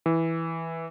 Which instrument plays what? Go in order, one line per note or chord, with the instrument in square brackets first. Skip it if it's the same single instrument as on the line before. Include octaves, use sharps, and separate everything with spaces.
[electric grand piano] E3